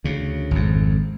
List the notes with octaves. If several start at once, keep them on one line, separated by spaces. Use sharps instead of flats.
D2 C#3
G#1 F2